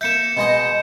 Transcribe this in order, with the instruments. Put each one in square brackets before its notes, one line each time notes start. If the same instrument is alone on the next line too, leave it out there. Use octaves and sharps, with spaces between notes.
[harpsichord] A#3 E5 [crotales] G6 C#7 E7
[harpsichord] B2 G#3 D#5